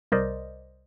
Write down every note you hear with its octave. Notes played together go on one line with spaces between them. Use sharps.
C2 A#4 C5 D5 D#5